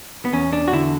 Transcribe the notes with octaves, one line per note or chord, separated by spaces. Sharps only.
B3
E2 C#4
D4
F#4
D3 E4